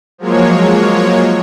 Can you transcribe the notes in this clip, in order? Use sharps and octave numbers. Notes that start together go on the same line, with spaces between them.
F3 F#3 G#3 A#3 C#5